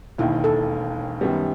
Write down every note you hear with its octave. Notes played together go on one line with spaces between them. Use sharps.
E1 D#2 D#3 E4
A4
F#2 D#3 G3 B3